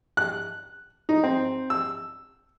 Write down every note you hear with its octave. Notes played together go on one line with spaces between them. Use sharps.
F#6
D#4
C4
E6